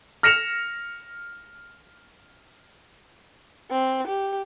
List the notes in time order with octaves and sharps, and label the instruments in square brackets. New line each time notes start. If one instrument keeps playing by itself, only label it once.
[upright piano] F6 A#6 C#7 E7 F7
[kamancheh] C4
G4